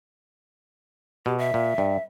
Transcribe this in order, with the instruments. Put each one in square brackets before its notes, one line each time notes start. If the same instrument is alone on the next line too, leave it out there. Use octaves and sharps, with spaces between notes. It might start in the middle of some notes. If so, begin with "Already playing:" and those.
[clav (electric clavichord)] B2 [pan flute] G4
[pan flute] E5
[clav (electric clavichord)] A#2
G2